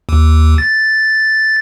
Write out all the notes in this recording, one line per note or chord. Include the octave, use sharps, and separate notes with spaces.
D#2
A6